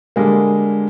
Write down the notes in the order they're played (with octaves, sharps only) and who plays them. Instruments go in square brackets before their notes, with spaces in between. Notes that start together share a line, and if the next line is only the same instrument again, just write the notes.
[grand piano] D3 G3 G#3 A#3